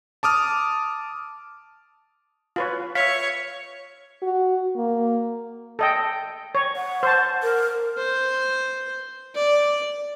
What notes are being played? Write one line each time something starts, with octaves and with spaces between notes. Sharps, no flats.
A5 D6 D#6 F6
F4 B4 C#5
C#5 E5 F5 B6
F#4
A#3
A4 D#5 G5
C#5
F#5
C5 A5
A#4
C5
D5